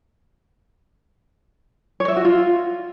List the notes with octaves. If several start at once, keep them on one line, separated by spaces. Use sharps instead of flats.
C#5
E5
F#4
F4